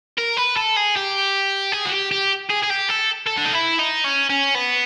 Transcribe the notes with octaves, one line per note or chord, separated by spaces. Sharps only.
A#4
B4
A4
G#4
G4
G#4
F#4
G4
G4
G#4
G#4
G4
A4
A4
D4
D#4
E4
D#4
C#4
C#4
B3